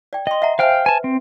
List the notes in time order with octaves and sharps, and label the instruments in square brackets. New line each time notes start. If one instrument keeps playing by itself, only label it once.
[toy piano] D5 G5
[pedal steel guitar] D#5 [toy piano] G5 C6
[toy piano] E5 F#5 A#5
[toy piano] C5 E5 G#5 [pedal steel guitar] F5 G5 F6
[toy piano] B4 [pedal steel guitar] G#5 A5
[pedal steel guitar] C4